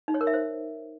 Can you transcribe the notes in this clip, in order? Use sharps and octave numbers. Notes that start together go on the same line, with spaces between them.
D#4
C#5
A#4
E5
C5